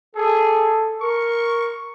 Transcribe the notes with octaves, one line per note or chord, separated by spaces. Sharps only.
G#4 A4
A#4 C#6